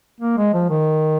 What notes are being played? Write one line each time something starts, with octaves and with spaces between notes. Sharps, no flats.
A#3
G#3
F3
D#3